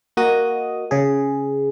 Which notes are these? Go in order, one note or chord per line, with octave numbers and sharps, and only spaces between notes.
A#3 F#4 D#5 D#6
C#3 G#4